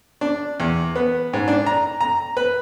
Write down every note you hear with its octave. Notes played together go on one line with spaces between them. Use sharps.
D4
E2
B3
G#2
D4
A#5
A#5
B4